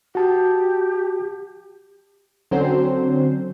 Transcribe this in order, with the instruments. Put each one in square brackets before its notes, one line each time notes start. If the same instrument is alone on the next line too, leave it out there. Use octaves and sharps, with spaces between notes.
[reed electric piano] F#4 A5 [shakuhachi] G4
[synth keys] D3 F#3 C4 C#4 C5